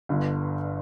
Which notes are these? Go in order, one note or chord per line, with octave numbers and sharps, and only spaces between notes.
G1 G2 D3